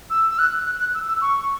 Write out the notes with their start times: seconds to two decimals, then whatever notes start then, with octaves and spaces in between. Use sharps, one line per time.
0.10 E6
0.31 E6
0.39 F#6
0.66 F#6
0.80 F#6
0.94 E6
1.08 E6
1.21 C#6